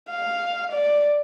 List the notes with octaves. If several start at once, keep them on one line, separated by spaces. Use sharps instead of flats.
F5
D5